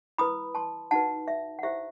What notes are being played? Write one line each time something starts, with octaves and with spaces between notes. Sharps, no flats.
E4 B4 B5 D#6
A5 C6
D#4 F#4 B4 F#5 A5
E5
F#5
E4 G4 C5 E5